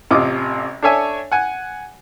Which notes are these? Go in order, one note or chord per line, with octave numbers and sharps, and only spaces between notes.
A1 C3 F4 D#5 D6
D4 A4 C#5 E5 G#5
F#5 G#5